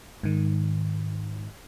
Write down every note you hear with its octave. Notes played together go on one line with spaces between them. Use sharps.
G#2 D#3